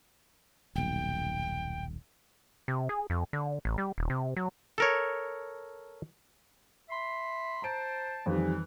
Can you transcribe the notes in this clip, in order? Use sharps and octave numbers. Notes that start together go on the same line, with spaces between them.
D#1 B1 G5
C3
G#4
F2
D3
A1
G3
D#1
C3
F#3
A4 A#4 C#5
E5 B5 C6
C5 A5 A#5 D7
F2 D#3 E3 G3